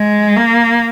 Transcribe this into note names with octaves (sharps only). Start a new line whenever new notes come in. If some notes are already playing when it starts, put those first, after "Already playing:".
Already playing: G#3
A#3